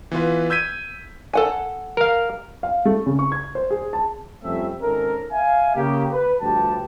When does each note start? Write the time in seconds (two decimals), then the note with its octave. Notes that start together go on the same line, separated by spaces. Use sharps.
0.11 E3 B3 F4 B4
0.50 E6 G6 G#6 B6 D#7
1.33 A4 F#5 G#5
1.97 A#4 F5
2.63 F5
2.85 A3
3.06 C#3
3.19 C#6
3.32 G#6
3.55 C5
3.70 G#4
3.93 A5
4.43 F2 G3 A3 C4 C#4 E5
4.81 G#1 G#2 C#4 A4 A#4
5.32 E5 F5 G#5
5.75 C#3 A#3 G4
6.12 B4
6.41 D2 G2 F3 G4 A5